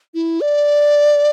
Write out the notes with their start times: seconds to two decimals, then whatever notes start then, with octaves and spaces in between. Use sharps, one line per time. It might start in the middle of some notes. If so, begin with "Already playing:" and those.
0.14 E4
0.41 D5